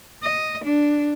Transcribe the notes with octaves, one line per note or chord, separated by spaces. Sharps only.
D#5
D4